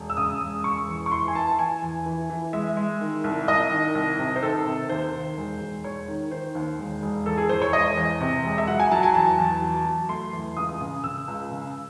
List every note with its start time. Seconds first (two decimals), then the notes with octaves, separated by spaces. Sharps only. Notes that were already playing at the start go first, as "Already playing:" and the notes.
Already playing: E1
0.10 E6
0.17 C#3 D#6
0.41 E1
0.64 E1 C#6
0.88 E2
1.06 C#6
1.11 E3 C6
1.28 G#5
1.35 E3 A5
1.59 E3 G#5
1.82 E2
2.06 E3
2.30 E3
2.53 G#3 E5
2.77 G#3
3.01 D#3
3.24 C2
3.48 C2 D#5
3.71 D#3
3.95 C2
4.19 C3
4.36 C5
4.42 D#3 A4
4.66 C3
4.89 D#2 C5
5.13 D#3
5.37 E1
5.61 E1
5.84 E1 C#5
6.08 D#3
6.31 D#3 C5
6.55 D#2
6.78 E1
7.02 E1
7.26 E2 A4
7.37 G#4
7.49 E2 C5
7.62 C#5
7.73 E1 D#5
7.97 E2
8.20 C3
8.44 E1
8.58 E5
8.68 F#3 F#5
8.80 G#5
8.92 F#3 A5
9.03 G#5
9.15 E2 A5
9.38 E2
9.62 F#3
9.86 F#3
10.09 A3 C6
10.33 E2
10.57 C#2 D#6
10.81 C#3
11.04 C#3 E6
11.28 C#2
11.51 C#3